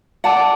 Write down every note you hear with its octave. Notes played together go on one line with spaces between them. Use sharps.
D5 F#5 A5